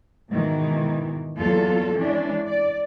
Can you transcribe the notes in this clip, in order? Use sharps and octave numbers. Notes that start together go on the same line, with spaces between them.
G#2 B2 D#3 E3
E2 F#3 A#3 F4 A4
E3 G#3 C#4 D4
D5